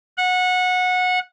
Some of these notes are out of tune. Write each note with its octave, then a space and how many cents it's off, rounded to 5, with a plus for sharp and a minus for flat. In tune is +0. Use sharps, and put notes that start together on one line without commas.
F#5 -20